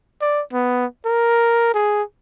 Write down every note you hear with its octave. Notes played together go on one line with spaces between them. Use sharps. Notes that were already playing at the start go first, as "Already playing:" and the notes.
D5
B3
A#4
G#4